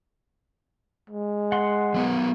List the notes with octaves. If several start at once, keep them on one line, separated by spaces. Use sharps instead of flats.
G#3
F#5 C6
F#3 B3 A#4